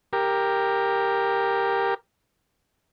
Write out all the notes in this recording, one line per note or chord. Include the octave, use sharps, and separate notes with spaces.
G4 A#4